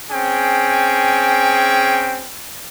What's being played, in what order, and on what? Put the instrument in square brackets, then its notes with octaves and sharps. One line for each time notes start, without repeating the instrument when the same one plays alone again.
[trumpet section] C4 C#4 G#4 G5